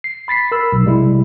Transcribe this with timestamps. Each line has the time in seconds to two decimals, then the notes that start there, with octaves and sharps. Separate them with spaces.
0.04 C7
0.28 B5 A6 B6 C7
0.52 A#4 B5 E6
0.72 B1
0.85 C3 G3 G#3 E4